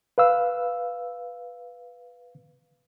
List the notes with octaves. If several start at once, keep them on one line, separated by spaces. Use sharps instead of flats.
B4 F5 E6